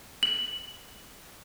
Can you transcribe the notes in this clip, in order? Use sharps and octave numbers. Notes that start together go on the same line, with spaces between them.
F#7